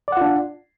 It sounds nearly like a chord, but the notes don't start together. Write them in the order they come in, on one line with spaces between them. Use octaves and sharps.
D5 F#5 F4 D4